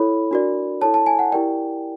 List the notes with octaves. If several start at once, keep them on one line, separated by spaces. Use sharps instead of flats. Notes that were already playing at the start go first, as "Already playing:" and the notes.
Already playing: E4 A4 C#5 B5
D4 F#4 A#4 D5
E4 A4 C#5 A5
A5
G#5
F#5
E4 G4 A#4 D5 G5